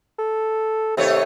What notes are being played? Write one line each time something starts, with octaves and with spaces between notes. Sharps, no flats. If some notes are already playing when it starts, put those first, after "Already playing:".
A4
D#2 C3 A3 C#5